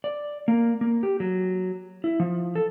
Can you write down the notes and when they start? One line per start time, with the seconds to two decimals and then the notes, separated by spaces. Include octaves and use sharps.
0.04 D5
0.48 A#3
0.81 A#3
1.03 G4
1.20 F#3
2.04 E4
2.20 F3
2.55 A4